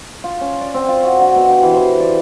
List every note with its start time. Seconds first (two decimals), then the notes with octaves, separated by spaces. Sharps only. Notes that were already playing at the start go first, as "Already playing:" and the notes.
0.24 F4
0.41 C#4
0.61 D5
0.74 C4
0.88 F4
1.03 F#4
1.19 D3
1.36 B2
1.49 G4
1.63 E3
1.74 C5
2.00 D5